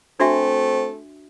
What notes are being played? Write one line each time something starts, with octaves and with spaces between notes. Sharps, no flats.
A3 C4 D4 F#4 E5